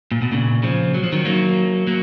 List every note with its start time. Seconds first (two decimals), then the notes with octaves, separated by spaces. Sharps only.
0.12 A#2
0.22 B2
0.32 A#2 C#3
0.63 C#3 F3
0.94 F#3
1.03 F3
1.12 D#3 F#3
1.25 F#3 A#3
1.87 F#3 A#3